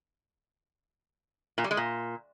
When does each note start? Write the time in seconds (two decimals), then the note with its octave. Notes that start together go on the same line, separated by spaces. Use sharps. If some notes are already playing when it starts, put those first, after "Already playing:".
1.58 A#2
1.64 G3
1.71 G#3
1.77 A#2